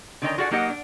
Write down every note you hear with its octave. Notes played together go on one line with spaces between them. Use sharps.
D3 D#3 C#4 D#5 G5 A#5
F4 F#4 G#4 A4 D5 F#5
F#3 A#3 D#4 G4 D#5 F#5
D4